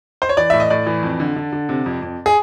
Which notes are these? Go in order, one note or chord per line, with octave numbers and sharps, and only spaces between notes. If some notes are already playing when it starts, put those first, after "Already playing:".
C5
C#5
E3 D5
A2 E5
D#5
A2 D5
E3
F2
D3
D3
D3
C3
F2
F2
G#4